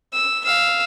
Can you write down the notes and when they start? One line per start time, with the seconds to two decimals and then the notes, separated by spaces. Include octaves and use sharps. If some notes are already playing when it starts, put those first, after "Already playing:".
0.13 E6
0.45 F5 E6